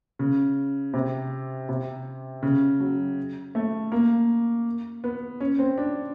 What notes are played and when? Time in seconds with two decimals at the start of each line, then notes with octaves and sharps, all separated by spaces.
0.19 C#3
0.94 C3
1.69 C3
2.43 C#3
2.80 F#3
3.55 A3
3.92 A#3
5.04 B3
5.41 C#4
5.59 C4
5.78 D4